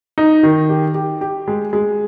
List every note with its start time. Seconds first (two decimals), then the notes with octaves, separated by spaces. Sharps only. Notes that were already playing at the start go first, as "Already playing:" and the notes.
0.18 D#4
0.43 D#3
0.69 G4
0.95 G4
1.21 G4
1.48 G#3
1.73 G#3